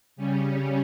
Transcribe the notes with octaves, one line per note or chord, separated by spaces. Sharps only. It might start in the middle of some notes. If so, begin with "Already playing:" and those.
C#3 G3 C#4